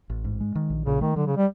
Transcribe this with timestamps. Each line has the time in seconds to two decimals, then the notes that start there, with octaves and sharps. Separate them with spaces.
0.10 A1
0.25 G#2
0.40 G#3
0.55 D#3
0.70 A#1
0.85 A#2 C#3
1.01 D#3 A3
1.16 D3 F#3
1.27 C#3
1.37 G3